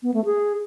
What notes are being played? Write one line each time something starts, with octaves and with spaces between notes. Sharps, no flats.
B3
A3
G#4